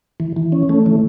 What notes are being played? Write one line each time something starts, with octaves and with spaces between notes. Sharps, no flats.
E3
E3
C#4
A3
E3